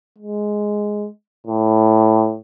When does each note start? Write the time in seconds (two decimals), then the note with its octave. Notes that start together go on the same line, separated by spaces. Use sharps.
0.18 G#3
1.46 A2